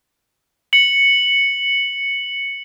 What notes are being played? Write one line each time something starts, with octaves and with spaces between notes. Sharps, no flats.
C#7 F#7